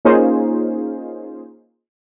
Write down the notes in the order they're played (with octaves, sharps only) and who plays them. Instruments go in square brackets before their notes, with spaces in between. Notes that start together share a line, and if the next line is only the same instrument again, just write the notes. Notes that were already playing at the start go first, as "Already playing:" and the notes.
[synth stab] A#3 C#4 D#4 F4 G#4 C5